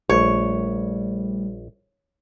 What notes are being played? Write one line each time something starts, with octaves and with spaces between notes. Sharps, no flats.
A#1 G3 A3 C#5